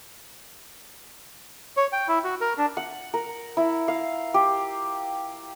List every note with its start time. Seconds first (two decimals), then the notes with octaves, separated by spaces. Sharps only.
1.77 C#5
1.93 G5
2.08 E4
2.24 F#4
2.41 A#4
2.58 D4
2.77 F#5
3.14 A#4
3.57 E4
3.88 F5
4.34 G4